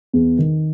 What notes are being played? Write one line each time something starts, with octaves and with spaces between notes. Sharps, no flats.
E2
D#3